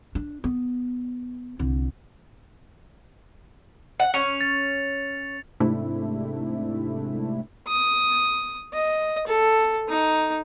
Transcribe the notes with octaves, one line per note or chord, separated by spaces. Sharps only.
D4
B3
C2 D3
F#5
C#4 C#7 F7
A6
G#2 C3 A3 D4 E4
D#6
D#5
A4
D#4